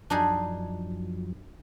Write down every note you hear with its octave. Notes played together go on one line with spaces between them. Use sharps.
F#2 F3 F#3 D4 D#4 G#4